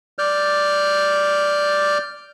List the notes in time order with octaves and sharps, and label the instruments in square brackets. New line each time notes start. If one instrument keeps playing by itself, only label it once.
[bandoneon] D5 F6 G6